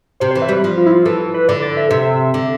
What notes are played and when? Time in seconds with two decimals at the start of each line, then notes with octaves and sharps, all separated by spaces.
0.20 C3 C5
0.31 C5
0.36 E3
0.42 E5
0.49 G3 B4
0.64 F3
0.77 F4
0.86 E4
0.92 F4
1.06 E3 A4
1.34 B4
1.48 D3 D5
1.62 D5
1.77 E5
1.91 C3 E5
2.34 D3